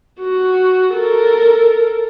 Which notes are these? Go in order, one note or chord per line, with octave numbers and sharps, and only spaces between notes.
F#4
A4 A#4